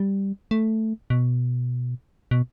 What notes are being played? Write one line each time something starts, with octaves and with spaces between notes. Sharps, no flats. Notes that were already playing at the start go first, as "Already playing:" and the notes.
Already playing: G3
A3
B2
B2